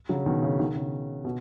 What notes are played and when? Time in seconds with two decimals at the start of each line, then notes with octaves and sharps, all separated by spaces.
0.09 C#3 F#3
0.26 B2 D#3
0.42 C#3
0.59 B2 D#3
0.75 C#3
1.25 B2